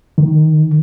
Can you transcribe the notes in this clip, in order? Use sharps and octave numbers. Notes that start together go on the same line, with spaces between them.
D#3